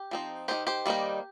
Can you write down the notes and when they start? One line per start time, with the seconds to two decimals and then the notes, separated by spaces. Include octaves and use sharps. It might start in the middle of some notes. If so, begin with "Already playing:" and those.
Already playing: G4
0.11 F3 C4 D#4
0.48 D#3 C4 D#4 G4 C5
0.67 G4 C5
0.86 D#3 G3 A#3 D#4